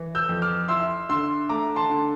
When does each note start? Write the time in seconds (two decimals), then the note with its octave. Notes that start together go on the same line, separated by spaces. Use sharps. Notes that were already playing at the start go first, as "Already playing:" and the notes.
Already playing: E3
0.15 E6 G6
0.29 F2
0.42 D6 F6
0.68 E4 C6 E6
1.09 D3 C6 E6
1.49 A3 A#5 D6
1.76 A5 C6
1.90 D3